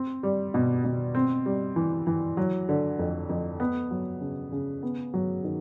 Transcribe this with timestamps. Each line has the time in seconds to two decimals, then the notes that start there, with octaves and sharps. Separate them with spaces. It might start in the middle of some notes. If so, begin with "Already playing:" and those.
Already playing: C4
0.23 G3
0.54 B2
0.84 B2
1.15 C4
1.46 G3
1.76 E3
2.07 E3
2.37 F#3
2.69 D3
2.99 F2
3.29 F2
3.60 B3
3.91 F#3
4.21 C#3
4.52 C#3
4.83 B3
5.14 F#3
5.44 D#3